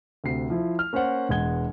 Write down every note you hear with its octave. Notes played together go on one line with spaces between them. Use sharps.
D2 C3 C7
F3 E4
F6
A#3 C#4 A#4 C5 F#5
E1 E2 G#3 F#5 G#6 G7